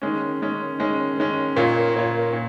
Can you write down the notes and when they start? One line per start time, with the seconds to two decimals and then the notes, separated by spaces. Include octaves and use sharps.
0.02 D#3 G#3 C#4
0.40 D#3 G#3 C#4
0.78 D#3 G#3 C#4
1.17 D#3 G#3 C#4
1.56 A#2 A#3 F4 C#5
1.95 A#2 A#3 F4 C#5
2.33 A#2